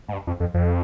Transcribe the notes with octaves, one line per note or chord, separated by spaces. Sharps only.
G#2
G2
F2
F2
F2